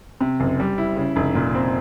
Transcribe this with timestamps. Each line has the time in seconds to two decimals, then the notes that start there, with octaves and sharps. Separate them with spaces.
0.21 C3
0.40 F#1
0.60 G3
0.78 E4
0.97 C#3
1.16 F1
1.35 A#2
1.55 C4